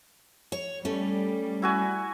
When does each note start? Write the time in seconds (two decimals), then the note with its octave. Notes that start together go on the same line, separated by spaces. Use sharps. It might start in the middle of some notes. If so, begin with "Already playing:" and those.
0.52 C#5
0.85 G3 A3 C#4
1.62 E4 F#4 G#5